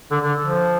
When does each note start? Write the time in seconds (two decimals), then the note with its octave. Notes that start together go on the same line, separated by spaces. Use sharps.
0.11 D3
0.22 D3
0.44 F3